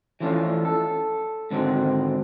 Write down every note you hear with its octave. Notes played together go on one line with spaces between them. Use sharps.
E3 F3 A3 C#4 D4 F4
A4
G#2 D3 D#3 C4 F#4